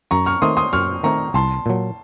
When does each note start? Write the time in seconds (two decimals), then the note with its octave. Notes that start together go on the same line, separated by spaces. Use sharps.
0.11 F#2 A#5 C#6
0.26 C#6 F6
0.42 D#3 A3 C4 C6 D#6
0.57 C6 D#6
0.73 F#2 C#6 F6
1.03 D#3 A3 C4 A#5 C#6
1.34 C2 A5 C6
1.66 A#2 F#3